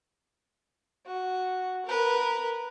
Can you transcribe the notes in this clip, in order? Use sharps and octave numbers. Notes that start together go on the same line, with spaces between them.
F#4
A#4 B4